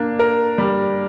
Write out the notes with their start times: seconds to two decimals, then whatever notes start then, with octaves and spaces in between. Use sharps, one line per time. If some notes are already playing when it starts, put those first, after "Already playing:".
Already playing: A#3 D4
0.19 A#4
0.58 G3